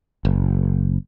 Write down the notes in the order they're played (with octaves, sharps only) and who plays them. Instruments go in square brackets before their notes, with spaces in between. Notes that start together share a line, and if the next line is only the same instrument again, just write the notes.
[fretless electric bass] F#1